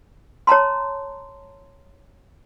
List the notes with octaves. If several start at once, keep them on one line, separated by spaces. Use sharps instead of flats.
C#5 A5 A#5 C6